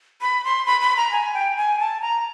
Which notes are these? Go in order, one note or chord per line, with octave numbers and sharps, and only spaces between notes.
B5
C6
B5
B5
A#5
G#5
G5
G#5
A5
A#5